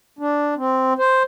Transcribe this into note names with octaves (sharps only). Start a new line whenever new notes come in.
D4
C4
C5